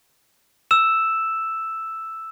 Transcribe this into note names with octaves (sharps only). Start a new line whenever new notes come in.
E6 E7